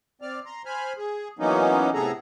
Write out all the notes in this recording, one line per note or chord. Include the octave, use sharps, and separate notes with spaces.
C4 D5 F6
A#5 C6
C5 G#5 B5 F6
G#4
E3 F#3 A#3 B3 C#4 D#4
A2 C3 B3 G#4 A4 A#5